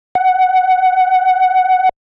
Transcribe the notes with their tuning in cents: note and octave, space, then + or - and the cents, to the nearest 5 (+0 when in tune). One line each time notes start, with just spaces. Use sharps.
F#5 +10